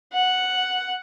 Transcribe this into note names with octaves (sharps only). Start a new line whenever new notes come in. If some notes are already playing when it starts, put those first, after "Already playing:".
F#5